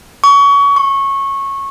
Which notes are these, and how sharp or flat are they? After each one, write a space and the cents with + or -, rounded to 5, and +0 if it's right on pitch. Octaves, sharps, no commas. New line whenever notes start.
C#6 +30
C#6 -15